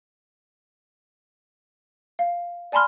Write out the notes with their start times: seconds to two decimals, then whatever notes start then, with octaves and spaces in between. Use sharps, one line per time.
2.19 F5
2.72 D5 G#5 A5 B5 C6 F6